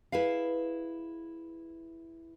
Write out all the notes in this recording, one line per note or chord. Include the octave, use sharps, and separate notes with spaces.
E4 G#4 B4 F5